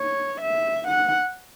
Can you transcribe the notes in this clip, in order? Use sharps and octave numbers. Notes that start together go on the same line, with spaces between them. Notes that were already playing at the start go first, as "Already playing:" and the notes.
Already playing: C#5
E5
F#5